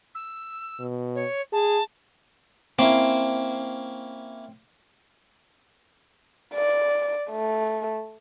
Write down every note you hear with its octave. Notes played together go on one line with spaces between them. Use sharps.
E6
B2
C#5
G#4 A5
A#3 C4 C#4 E4
D5
A3